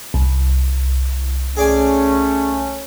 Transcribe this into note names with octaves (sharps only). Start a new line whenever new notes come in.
C2
A3 C#4 G#4 D5 G#5